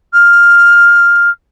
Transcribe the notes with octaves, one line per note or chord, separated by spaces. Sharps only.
F6